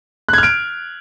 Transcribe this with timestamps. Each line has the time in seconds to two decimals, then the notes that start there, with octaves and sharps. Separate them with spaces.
0.29 F#6
0.33 G#6
0.38 F6
0.43 D7